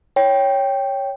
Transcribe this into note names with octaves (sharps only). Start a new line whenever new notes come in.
C#5 G5